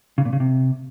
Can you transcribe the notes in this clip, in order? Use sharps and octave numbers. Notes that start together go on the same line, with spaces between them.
C#3
A#2
C#3
C3